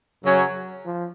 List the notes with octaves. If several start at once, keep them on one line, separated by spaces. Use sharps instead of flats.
F#2 C#3 F#3 C#4
F3